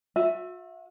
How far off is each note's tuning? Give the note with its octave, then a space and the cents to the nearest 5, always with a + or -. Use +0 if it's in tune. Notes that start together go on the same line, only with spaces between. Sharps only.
F#4 -45 E5 +0